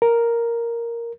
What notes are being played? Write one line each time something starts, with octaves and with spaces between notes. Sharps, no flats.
A#4